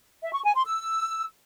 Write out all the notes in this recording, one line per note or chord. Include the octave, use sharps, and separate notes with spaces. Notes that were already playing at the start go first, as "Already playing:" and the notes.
E5
C#6
G#5
C6
E6